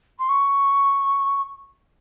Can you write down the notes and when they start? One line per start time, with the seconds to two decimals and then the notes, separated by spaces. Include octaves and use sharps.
0.18 C6
0.28 C#6